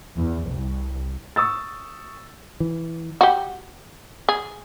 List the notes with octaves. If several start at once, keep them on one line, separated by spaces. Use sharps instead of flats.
E2
C2
C#6 D#6 E6 A6
E3
F#4 G4
G#4